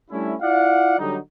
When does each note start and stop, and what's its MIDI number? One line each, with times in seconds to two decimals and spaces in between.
0.11 0.34 55
0.11 0.34 57
0.11 0.34 61
0.11 0.34 62
0.11 0.34 64
0.41 0.95 64
0.41 0.95 65
0.41 0.95 74
0.41 0.95 77
0.41 0.95 78
0.99 1.18 50
0.99 1.18 54
0.99 1.18 55
0.99 1.18 63